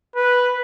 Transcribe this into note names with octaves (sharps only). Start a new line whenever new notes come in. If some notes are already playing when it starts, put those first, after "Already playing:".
B4